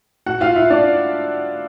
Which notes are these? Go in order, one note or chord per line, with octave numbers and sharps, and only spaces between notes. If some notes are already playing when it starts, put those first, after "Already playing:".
F#4 F#5
F4 F5
E4 E5
D4 D5